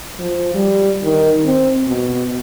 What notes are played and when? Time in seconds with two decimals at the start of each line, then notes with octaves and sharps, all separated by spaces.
0.19 F3
0.55 G3
1.04 D#3
1.45 C4
1.88 B2